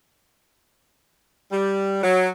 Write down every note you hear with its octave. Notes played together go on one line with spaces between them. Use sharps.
G3
F#3